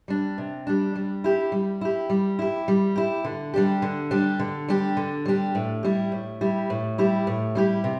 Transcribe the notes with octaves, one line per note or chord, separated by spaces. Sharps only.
G3 D4
C3
G3 D4
G3
E4 G4
G3
E4 G4
G3
E4 G4
G3
E4 G4
D3
G3 D4 G4
D3
G3 D4 G4
D3
G3 D4 G4
D3
G3 D4 G4
A2
G3 E4 G4
A2
G3 E4 G4
A2
G3 E4 G4
A2
G3 E4 G4
C3